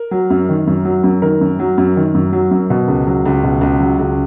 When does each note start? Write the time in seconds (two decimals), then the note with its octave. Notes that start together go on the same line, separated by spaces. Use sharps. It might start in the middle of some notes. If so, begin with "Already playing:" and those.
Already playing: A#4
0.11 F#3
0.30 F#2
0.49 D#3
0.67 F#2
0.85 F#3
1.04 F#2
1.22 D#3 A#4
1.41 F#2
1.59 F#3
1.78 F#2
1.96 D#3
2.15 F#2
2.32 F#3
2.51 F#2
2.70 B2
2.88 C#2
3.07 F#3
3.26 C#2
3.44 B2
3.61 C#2
3.80 F#3
3.99 C#2